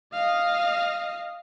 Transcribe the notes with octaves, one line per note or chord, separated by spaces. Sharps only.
D#5 F5